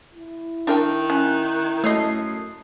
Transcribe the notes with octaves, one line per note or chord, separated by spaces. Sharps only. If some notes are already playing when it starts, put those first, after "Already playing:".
E4
D#3 D4 A#4 G5
C#4 F#6
F#2 A3 C#5 D#5 D#6 C7